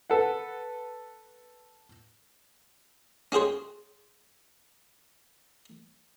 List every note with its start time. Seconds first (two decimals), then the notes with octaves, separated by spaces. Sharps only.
0.10 A4 B4 F#5
3.32 C#4 F#4 G#4 C5 C#5